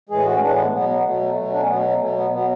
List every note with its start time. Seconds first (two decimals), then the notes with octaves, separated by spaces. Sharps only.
0.09 A2 E3 G#3 G#4
0.25 F#4
0.34 C#4
0.41 A2 E3 G#3 D4
0.52 B3
0.73 B2 F#3 B3
0.89 B3
1.05 B2 F#3 A3
1.21 A3
1.36 B2 F#3
1.52 D4
1.60 C#4
1.68 B2 F#3 B3
1.79 A3
1.89 A3
2.00 B2 F#3 A3
2.16 B3
2.32 B2 F#3 B3